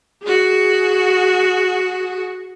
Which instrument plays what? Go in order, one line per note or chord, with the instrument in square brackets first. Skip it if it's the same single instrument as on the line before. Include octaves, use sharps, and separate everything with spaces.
[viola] F#4 G#4